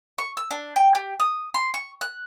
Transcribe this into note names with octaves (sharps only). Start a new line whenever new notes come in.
C#6
E6
D4
G5
G4
D#6
C6
C#6
F#6